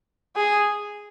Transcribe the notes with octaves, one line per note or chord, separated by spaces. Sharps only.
G#4